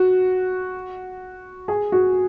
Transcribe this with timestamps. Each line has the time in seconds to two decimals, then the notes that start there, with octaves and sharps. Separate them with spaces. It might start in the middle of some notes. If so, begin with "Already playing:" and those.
Already playing: F#4
1.68 G#4
1.92 F#4